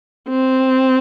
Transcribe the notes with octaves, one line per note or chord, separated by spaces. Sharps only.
C4